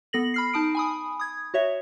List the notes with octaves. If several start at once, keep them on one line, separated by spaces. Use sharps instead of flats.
B3 A4 A#6 F#7
B5 F6 C7
D#4 A5 D#6 D7
G#5 B5 D#6
D#6 G#6
F#4 C#5 E5